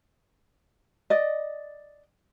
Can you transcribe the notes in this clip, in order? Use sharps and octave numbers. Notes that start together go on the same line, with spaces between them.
D5 D#5